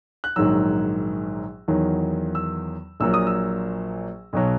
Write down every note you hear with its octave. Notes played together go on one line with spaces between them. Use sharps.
F#6
A#1 G#2 D#3 F#3 E6
E2 D#3 F#3
E6
A#1 A#2 F#3 E6
D#6
E6
B1 B2 F#3